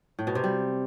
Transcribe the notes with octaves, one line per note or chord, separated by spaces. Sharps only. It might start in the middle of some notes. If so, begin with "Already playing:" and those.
A2
B2
C3
G3